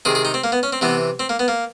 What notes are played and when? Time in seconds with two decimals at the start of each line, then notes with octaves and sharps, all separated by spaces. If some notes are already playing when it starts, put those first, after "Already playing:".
0.05 C3 D#3 G#4
0.15 G#4
0.25 D#4
0.34 C4
0.44 A#3
0.52 B3
0.63 C#4
0.73 C4
0.81 C3 E3 B3
1.20 C4
1.29 A#3
1.39 B3
1.48 A#3